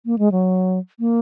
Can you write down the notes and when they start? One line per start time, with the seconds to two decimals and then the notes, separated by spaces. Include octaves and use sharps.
0.06 A#3
0.18 G#3
0.32 F#3
1.00 A#3